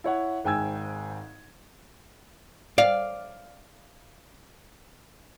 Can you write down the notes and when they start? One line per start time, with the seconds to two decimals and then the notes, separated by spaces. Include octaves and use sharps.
0.04 E4 C#5 F#5
0.44 G#1 G#2 G5 G#5 E6 G#6
2.78 D5 F5